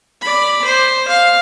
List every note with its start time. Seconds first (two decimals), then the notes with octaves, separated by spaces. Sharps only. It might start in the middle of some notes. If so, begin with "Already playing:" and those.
0.22 D5 B5
0.65 C5
1.08 F5